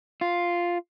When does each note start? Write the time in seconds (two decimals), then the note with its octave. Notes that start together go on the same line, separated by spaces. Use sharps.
0.21 F4